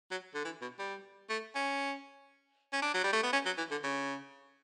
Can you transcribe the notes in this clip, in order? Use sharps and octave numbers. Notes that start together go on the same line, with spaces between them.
F#3
D3
E3
B2
G3
A3
C#4
C#4
D4
F#3
G3
A3
B3
C#4
F#3
E3
D3
C#3